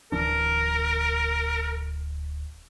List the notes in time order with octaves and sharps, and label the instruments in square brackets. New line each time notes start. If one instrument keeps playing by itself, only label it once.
[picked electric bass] D1 E3 D4 [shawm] A#4